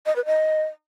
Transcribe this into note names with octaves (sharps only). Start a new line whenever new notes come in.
D#5
B4
D#5